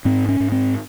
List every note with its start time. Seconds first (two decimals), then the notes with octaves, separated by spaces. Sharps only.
0.05 G#2 C4
0.29 C#4
0.40 G#2
0.52 C4